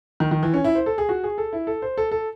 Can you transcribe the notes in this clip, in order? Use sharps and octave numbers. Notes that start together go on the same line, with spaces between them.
D#3
D#3
E3
C#4
E4
C5
A4
G#4
F#4
G#4
A4
E4
A4
C5
A4
A4